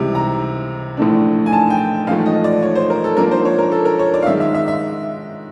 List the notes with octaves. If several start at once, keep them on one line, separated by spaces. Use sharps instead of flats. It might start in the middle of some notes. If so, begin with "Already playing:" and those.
Already playing: C#2 C3 E3 G3
A#5
A#1 A2 E3 A3 D4
G#5
A5
G5
A1 G#2 F3 A3 F5
D#5
D5
C#5
C5
A#4
A4
G#2 F3 A#3 D4 A#4
C5
C#5
A#4
A4
A#4
C#5
D5
F5
G#2 D#3 G#3 E5
E5
E5
E5